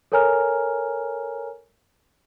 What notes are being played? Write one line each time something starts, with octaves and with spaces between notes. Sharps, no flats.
A4 A#4 C#5 G#5 A#5 F6